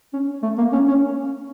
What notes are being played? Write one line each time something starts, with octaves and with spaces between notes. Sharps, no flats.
C#4
A3
A#3
C#4
C#4